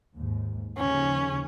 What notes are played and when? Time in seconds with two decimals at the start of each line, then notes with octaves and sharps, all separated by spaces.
0.16 D#2 G#2
0.78 D#2 C#3 F3 C#4